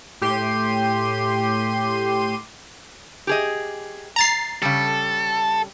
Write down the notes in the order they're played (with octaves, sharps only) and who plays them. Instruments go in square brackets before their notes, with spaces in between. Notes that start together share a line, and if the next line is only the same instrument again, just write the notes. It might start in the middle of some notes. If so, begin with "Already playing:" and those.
[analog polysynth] A2 G4 C6 D#7
[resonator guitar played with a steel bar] G4 G#4 D#5
[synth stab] A#5 A6 C7
[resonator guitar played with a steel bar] C#3 G3 [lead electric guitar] A4